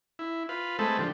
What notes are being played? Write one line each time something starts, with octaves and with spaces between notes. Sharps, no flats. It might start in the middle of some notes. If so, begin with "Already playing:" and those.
E4
F4 B4
G#3 A3 C4 A4 B4
D3 F3 G4